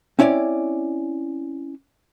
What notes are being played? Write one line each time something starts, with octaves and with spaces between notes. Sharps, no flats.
C4 C#4 E4 C#5 D5